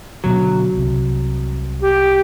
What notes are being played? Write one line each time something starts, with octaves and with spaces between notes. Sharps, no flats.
D2 B2 D3 F#3
C2 C3
G4